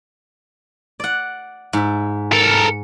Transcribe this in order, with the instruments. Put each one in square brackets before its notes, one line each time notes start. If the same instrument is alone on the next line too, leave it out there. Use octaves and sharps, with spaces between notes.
[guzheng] D5 F#5
G#2 E5
[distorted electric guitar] A4 A#4